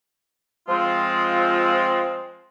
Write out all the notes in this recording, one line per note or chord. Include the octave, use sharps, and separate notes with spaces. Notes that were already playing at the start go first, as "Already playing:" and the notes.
F3 G#3 C4 F4